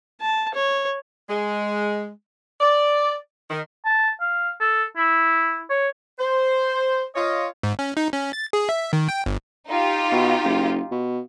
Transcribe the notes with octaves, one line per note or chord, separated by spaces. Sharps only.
A5
C#5
G#3
D5
D#3
A5
F5
A4
E4
C#5
C5
F4 C#5 D#5
G#2
C#4
D#4
C#4
A6
G#4
E5
D#3
G5
G1
D#4 F4 G4
B2
F#1
B2